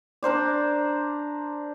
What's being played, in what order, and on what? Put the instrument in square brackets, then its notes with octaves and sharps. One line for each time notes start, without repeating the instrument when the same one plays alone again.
[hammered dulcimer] D4 A#4 C5 D5